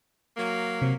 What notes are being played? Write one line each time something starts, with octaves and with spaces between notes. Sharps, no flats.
F#3 A#3
C3